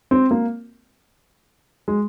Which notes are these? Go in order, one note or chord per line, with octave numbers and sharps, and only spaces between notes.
C4
A#3
G#3